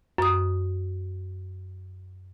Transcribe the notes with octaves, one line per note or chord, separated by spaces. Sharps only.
F#2 D#6